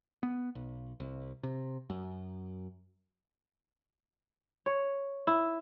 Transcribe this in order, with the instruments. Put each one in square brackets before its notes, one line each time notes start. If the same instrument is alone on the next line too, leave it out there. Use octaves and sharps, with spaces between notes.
[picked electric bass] B3
B1
C2
C3
F#2
[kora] C#5
E4